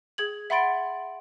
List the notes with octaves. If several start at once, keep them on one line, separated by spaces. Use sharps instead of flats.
G#4 G#6 F#7
E5 F#5 B5 C6 A6 D7